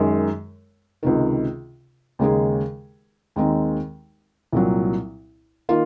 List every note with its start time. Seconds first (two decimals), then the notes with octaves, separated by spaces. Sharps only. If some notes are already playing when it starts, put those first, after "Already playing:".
Already playing: F#2 D#3 G#3
1.03 C#2 C3 D#3
2.19 D#2 C#3 G#3 D#4 G#4
3.36 D#2 D#3 G#3 C4 D#4
4.53 C2 A#2 F#3
5.69 D#3 A#3 F4